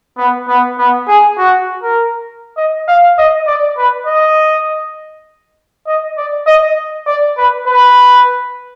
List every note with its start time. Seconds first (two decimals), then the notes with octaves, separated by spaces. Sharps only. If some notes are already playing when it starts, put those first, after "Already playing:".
0.18 B3
0.48 B3
0.78 B3
1.08 G#4
1.38 F#4
1.83 A#4
2.57 D#5
2.88 F5
3.18 D#5
3.47 D5
3.78 B4
4.07 D#5
5.87 D#5
6.17 D5
6.47 D#5
7.07 D5
7.37 B4
7.67 B4